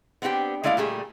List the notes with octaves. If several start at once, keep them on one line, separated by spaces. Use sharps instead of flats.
B3 C4 D4 F#4 G4
G#3 A3 E4 D5 E5 F5
A#2 G3 A3 G#4